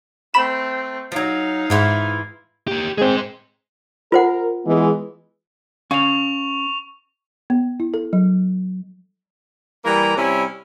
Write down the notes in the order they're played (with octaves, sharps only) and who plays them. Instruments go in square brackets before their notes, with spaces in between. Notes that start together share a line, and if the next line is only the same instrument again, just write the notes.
[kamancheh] A3 C4 [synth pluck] B5 E7
[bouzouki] F3 F#3 [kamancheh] D#4 F5
[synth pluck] G#2 [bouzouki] E3 E4 F4
[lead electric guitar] A#3 G4
[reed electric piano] G#3 C4 [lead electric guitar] G#4 C5
[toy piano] F4 C5 F#5 [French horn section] A#4
[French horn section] E3 G#3 B3
[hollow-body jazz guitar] C#4 F5 [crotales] C#6 F7
[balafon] B3
E4
A4
F#3
[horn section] E3 G3 A#3 A#5
C3 G3 C#4 E4